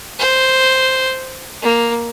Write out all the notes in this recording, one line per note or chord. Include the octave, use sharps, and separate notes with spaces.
C5
A#3